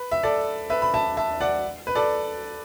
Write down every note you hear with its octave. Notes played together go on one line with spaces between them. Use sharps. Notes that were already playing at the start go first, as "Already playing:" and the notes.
Already playing: B4
E5
A4 D5
B4 E5
B5
E5 A5
E5 A5
D5 F#5
B4
A4 D5